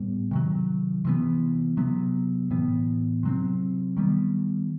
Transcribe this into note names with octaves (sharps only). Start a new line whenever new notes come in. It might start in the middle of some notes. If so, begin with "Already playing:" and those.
Already playing: A2 G3 B3
C3 D#3 F#3
C3 E3 B3
C3 F#3 B3
A2 E3 B3
C3 F#3 C4
D#3 G3 B3